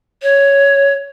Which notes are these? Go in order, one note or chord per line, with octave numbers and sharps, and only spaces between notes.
C#5